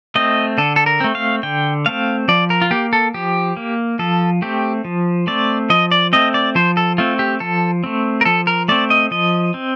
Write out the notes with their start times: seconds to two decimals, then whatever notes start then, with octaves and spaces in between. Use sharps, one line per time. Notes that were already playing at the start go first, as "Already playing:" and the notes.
0.15 A3 C4 D#5
0.58 D3 A4
0.76 A4
0.86 A#4
1.01 A3 C4
1.15 F5
1.43 D3 G5
1.86 A3 C4 F5
2.28 F3 D5
2.50 A#4
2.62 F4
2.71 A#3 G4
2.93 A4
3.14 F3 G4
3.57 A#3
3.99 F3 A4
4.42 A3 C4 G4
4.85 F3
5.27 A3 C4 D5
5.70 F3 D#5
5.91 D5
6.13 A3 C4 D#5
6.34 D5
6.55 F3 C5
6.77 A4
6.98 A3 C4 F4
7.19 G4
7.40 F3 A4
7.84 A3 C4
8.21 A#4
8.25 F3 A4
8.47 A#4
8.68 A3 C4 D5
8.90 D#5
9.11 F3 D#5
9.54 C4